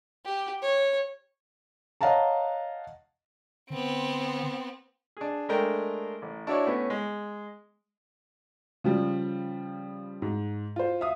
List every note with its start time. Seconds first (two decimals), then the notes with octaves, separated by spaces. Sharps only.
0.25 G4
0.62 C#5
2.01 C#5 D#5 F5 F#5 A5 A#5
3.70 D3 B3 C4
5.17 D4 G#4
5.49 G#3 A3 D4 A#4 G5
6.22 A1
6.47 D4 E4 F#4 C#5 D5
6.66 A2 B3 C#4 B4
6.90 G#3
8.84 C#3 F3 G3
10.22 G#2
10.76 F4 C5
11.01 E5 F5 D#6